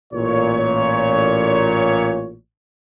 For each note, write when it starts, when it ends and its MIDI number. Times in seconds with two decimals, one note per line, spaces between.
0.14 2.35 33
0.14 2.35 46
0.14 2.35 73